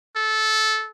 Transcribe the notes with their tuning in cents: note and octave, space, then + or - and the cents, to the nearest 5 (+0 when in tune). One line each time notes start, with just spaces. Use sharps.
A4 -15